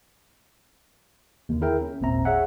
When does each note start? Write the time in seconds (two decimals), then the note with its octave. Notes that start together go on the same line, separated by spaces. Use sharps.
1.49 D#2 D3
1.61 E4 G#4 A#4 E5 G5
1.81 C#4
2.01 G#1 D#2 A#2 C4 E5 A#5
2.25 G#4 C#5 E5 F#5 G#5